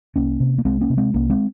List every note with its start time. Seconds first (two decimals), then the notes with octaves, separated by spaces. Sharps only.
0.16 C2 A#3 C#4
0.40 C3
0.58 A#3
0.65 C2 G#3 C4
0.81 A#3 C#4
0.90 C3
0.97 G#3 C4
1.14 C2 A#3 C#4
1.30 G#3 C4